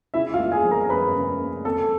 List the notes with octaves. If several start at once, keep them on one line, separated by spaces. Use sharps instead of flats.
C#3 E4 E5
F4 F5
A#3
G#4 G#5
F3
A#4 A#5
C#4 B4 B5
C#3
A#3
F2 A4 A5